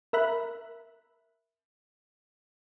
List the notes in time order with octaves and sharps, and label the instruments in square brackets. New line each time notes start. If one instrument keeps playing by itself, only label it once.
[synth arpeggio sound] A#4 E5 B5 F#6